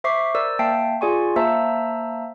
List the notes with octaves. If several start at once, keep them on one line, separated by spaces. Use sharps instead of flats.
C5 E5 C#6 D6 B6 C7
A#4 C5 D5 E6
A#3 E5 G5 A5 C7
F4 G#4 D5 G#5 C6 C#6
A#3 C5 E5 A5 A#5 E6